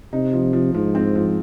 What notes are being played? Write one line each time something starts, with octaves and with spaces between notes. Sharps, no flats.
C3 D#4
F3
F3
G#2 F3
C4
F3